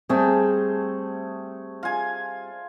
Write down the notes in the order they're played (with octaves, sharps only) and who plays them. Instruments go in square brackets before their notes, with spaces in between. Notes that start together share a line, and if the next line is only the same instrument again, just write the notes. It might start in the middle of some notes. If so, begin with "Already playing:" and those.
[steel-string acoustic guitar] G3 C4 [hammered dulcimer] A3 G#4
[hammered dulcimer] F4 G#5